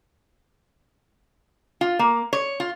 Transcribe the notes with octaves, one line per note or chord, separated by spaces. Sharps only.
F4
A#3
C#5
F4